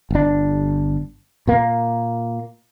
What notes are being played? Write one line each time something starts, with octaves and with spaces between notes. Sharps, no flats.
G1 D4
A#2 A#3